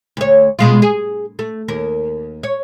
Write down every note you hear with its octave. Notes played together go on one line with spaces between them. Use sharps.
D2 C#5
B2 G#3 F4
G#4
A3
D#2 A#4
C#5